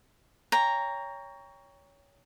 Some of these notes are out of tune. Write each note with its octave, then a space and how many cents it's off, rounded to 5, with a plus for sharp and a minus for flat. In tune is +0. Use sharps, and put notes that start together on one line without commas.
C#5 +20 G5 +25 A#5 +0